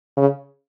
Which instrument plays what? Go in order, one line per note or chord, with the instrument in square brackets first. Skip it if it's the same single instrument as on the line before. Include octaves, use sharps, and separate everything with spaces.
[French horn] C#3